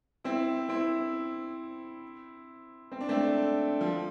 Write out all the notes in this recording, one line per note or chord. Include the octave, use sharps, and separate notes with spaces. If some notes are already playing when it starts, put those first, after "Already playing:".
C4 E4
C4 E4
C4
D4
A3 C4
F3